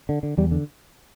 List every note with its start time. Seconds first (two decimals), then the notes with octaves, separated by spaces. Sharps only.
0.09 D3
0.23 D3
0.37 E2 G3
0.51 D3